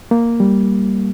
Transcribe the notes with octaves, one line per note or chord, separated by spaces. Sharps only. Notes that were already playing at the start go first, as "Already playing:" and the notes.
A#3
G3